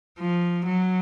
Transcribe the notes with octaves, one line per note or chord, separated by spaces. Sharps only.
F3
F#3